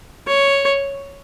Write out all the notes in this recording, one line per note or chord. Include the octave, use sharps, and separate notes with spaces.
C#5